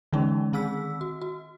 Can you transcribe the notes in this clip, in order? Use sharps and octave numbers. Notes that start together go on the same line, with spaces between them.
D3 E3 G#3 C#4 D#4
D#3 C4 G#4 E6 B6
F#4
F#4